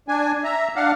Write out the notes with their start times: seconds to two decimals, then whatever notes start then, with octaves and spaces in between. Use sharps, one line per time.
0.08 D4 G#5
0.44 E5 A#5
0.76 D4 F5 F#5